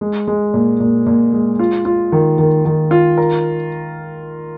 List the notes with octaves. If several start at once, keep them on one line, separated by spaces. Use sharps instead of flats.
G#3
G#3
A#2
A#2
A#2
G#3
F4
F4
D#3
D#3
D#3
F4
A#4